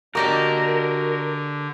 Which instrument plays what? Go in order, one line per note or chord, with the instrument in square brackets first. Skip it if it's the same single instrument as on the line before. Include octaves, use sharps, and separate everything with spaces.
[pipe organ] D3 [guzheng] A#3 G4 D5 [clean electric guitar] F#4 D#5 [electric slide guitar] A#4